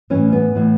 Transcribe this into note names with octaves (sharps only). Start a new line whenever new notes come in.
A2 E3 C#4
B3
A2 E3